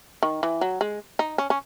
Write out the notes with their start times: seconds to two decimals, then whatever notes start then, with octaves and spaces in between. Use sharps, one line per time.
0.23 D#3
0.43 E3
0.61 F#3
0.81 G#3
1.19 D#4
1.38 C#4
1.50 C#4